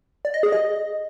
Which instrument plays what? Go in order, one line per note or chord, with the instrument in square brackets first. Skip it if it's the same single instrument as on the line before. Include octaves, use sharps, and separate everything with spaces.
[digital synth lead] D5
D#5
G#4
D#5